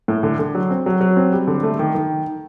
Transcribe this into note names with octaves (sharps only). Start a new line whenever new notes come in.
A2
D3
D3
F#3
C4
F#3
F#3
C4
G3
D3
A3
D#3
D#3